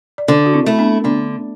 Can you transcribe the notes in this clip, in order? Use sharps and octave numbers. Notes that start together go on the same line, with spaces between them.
D5
D3 A4 C5
F#4
C4 E4
A3 E4
B3 D4
D3 B3 D4